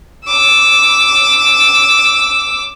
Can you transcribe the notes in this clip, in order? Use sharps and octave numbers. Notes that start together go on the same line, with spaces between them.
D6 E6